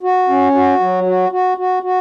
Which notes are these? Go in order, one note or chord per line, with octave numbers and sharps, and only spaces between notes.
F#4
C#4
F#4
F#3
F#4
F#4
F#4
F#4